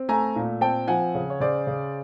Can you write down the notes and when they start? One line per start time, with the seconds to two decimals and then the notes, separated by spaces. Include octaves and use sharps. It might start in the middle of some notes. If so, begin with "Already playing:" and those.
Already playing: C4
0.09 A3 G#5 A#5
0.36 A#2
0.61 C4 G5 A5
0.88 F3 F#5 G#5
1.15 C#3
1.30 C#5
1.40 C#3 C5 D5
1.67 C#3